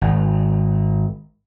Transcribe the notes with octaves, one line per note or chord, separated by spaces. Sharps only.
G#1